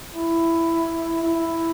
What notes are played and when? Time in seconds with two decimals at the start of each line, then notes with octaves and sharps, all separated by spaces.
0.15 E4
1.23 E4